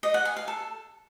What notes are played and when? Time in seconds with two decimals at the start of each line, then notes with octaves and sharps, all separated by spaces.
0.03 D#5
0.14 F#5
0.25 G#5
0.37 F5
0.48 A4